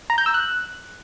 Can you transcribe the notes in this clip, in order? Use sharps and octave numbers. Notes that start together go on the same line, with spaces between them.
A#5
G6
E6
F#6